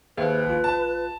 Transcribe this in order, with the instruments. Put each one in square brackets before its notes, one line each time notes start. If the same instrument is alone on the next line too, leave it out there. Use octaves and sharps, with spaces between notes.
[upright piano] D#2 [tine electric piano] G#4 C5 E5 [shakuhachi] B4
[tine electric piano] A#1 F4
[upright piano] A5